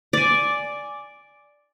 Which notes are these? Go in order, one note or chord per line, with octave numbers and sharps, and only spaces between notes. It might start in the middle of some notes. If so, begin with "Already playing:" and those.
D5 G#5